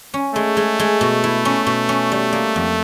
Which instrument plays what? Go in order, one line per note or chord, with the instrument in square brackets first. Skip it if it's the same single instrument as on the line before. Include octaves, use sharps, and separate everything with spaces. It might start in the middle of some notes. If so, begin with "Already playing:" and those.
[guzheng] C#4
[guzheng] G#3 [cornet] A3
[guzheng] G#3
G#3
B2
E4
C#4
B2
C#4
G3
A#3
F2